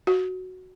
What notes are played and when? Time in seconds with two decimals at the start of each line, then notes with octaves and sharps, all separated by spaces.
0.07 F#4